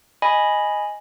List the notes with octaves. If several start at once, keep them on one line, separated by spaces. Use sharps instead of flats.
D#5 G#5 B5